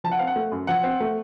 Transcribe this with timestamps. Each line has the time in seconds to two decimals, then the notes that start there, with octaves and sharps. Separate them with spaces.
0.04 F3 A5
0.11 F#5
0.19 C4 F5
0.27 F#5
0.36 A3
0.52 F#2
0.67 F3 F#5
0.84 C4
1.00 A3